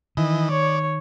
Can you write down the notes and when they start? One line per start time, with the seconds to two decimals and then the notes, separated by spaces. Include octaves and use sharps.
0.17 D#3 E3 D#5
0.49 C#5 D5